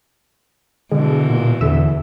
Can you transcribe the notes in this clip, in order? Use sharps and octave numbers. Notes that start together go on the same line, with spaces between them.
B2 D3 E3 G#3
A#2
E2 D3 E5